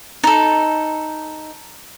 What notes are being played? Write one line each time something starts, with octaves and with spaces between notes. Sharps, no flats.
D#4 A4